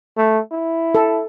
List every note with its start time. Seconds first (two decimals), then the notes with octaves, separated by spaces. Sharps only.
0.17 A3
0.51 E4
0.95 A4